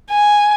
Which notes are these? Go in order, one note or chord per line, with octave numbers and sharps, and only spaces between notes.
G#5